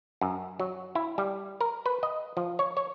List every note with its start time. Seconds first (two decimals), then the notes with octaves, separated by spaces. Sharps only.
0.21 F#2
0.60 F#3
0.95 E4
1.18 G3
1.61 A#4
1.86 B4
2.03 D#5
2.37 F3
2.59 C#5
2.77 C#5